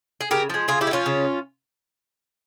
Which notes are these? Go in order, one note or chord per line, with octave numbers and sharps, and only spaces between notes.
G#4
C#3 G4 A#4
F3 G#3
C#3 F4 G#4
E4 G4
G#3
F3 C#4 F4
C#3